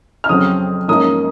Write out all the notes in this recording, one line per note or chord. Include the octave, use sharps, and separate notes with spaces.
F6
F2 C#3 F#3 C4 D#6
G#2 F3 A#3 C#4 D#6